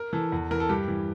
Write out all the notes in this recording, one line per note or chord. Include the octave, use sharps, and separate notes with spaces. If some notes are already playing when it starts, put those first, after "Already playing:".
Already playing: A#4
E3 A4
E2
E3 A#4
A4
G2 G4
E3